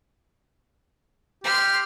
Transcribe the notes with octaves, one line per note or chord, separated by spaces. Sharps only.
G4 C6 F6